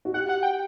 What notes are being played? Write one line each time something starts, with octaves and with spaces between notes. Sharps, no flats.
F#4
G4 F#5
F#5
G5